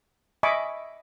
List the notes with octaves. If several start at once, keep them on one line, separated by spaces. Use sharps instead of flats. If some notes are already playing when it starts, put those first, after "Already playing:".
D#5 E5 G#5 B5 C#6 D6